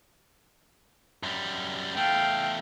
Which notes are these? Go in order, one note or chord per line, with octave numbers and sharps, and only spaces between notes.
F#2 G3
E2 A3 F5 G5